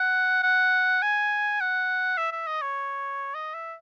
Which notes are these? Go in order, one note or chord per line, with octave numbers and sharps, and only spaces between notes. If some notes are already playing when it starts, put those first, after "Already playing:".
Already playing: F#5
F#5
G#5
F#5
E5
E5
D#5
C#5
D#5
E5